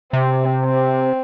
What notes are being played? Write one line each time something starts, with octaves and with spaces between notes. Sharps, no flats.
C3 C4
C4